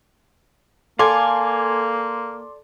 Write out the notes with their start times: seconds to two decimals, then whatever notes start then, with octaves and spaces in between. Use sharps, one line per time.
0.99 A#3 A4 D5 F5 G#5 C6 D6